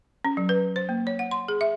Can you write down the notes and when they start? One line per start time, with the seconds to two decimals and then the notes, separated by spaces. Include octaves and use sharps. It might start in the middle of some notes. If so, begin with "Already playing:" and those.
0.25 C#4
0.37 F#3
0.49 B4
0.76 C5
0.89 A#3
1.07 C#5
1.19 F#5
1.31 C6
1.48 G#4
1.61 E5